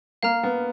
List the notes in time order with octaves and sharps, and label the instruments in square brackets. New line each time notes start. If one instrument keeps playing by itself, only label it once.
[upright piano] A#3 [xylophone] F5 A#5 F6
[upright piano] B3